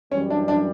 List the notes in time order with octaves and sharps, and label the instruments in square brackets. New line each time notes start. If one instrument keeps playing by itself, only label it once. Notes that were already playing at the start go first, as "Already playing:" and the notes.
[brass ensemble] F#2 E3 G3 [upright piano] C#4
[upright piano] D4
D4